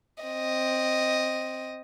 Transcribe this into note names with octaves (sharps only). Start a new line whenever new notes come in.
C4 D#5